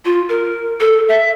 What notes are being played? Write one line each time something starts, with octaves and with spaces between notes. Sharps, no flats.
F4
A#4
A4
E5